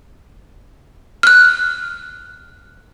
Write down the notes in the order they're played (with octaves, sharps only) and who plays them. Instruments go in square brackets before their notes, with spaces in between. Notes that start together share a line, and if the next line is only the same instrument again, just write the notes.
[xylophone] F6 F#6